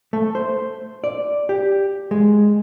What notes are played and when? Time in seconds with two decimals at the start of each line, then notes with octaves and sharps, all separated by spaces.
0.13 A3
0.35 C5
1.04 D5
1.49 G4
2.11 G#3